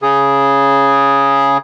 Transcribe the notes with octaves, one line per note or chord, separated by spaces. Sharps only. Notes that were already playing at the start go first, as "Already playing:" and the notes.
C#3 G#4